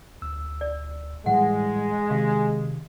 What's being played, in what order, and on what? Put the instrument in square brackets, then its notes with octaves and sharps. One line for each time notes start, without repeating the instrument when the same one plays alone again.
[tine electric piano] D2 E6
[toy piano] D5
[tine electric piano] A2 E3 G3 [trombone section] G#3 [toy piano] F#5
[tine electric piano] C3 D#3 [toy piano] F5 C6